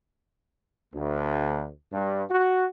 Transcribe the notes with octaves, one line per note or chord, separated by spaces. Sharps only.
D2
G2
F#4